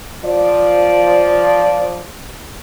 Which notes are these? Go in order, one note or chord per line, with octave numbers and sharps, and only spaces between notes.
F3 D5